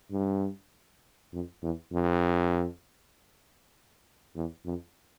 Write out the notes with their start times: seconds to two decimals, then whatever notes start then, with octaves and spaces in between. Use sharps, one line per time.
0.11 G2
1.33 F2
1.62 E2
1.93 F2
4.35 E2
4.65 F2